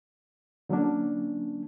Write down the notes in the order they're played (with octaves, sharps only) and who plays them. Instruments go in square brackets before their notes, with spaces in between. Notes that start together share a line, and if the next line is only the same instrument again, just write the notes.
[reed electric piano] D3 F#3 A#3 C#4 D4